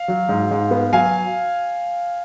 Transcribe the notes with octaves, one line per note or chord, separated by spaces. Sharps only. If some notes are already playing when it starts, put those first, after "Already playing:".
Already playing: F5
F#3
G#2
G#2
B3
F#3 F5 G#5